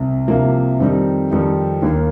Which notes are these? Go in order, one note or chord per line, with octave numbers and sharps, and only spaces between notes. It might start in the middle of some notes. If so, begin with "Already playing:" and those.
Already playing: C2 C3
C2 C3 F3 A#3
F2 D#3 G3 C4 D#4
F2 D#3 G3 C4 D#4
D#2 D#3 A#3